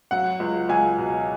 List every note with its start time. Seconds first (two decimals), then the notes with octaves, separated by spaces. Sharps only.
0.11 F#3 F#5
0.40 C#2
0.69 C#2 G#5
0.98 B2